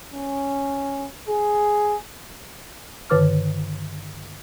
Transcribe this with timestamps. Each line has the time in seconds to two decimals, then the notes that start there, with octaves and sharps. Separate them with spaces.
0.14 C#4
1.29 G#4
3.10 G2 D3 D#3 B4 D6 F6